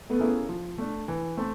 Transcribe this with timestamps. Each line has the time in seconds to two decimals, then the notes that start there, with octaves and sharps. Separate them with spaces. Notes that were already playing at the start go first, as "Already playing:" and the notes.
0.10 A3 B3
0.19 A#3 C#4 E4 G#4
0.49 F3
0.78 A3 D4
1.08 E3
1.37 A3 C4